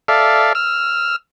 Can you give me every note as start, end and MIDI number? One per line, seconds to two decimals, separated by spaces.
0.08 0.53 69
0.08 0.53 74
0.08 0.53 76
0.08 0.53 77
0.55 1.16 88
0.55 1.16 89